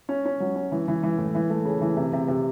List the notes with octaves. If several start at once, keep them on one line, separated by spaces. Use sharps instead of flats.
C#4
C#4
F#3
C#4
E3
E3
E3
A2
E3
A3
C#3
E3
C3
C3
C3